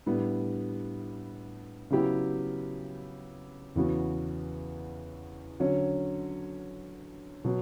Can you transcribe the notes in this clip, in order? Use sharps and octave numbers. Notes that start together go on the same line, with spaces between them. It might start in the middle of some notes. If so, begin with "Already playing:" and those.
A2 G3 B3 D4
C#3 F#3 B3 E4 G4
E2 C#3 E3 B3 F#4
D3 F#3 C#4
B2 F#3